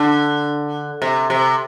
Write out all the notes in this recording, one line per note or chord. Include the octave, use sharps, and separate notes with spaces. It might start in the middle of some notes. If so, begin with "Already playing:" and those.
Already playing: D3
C3
C3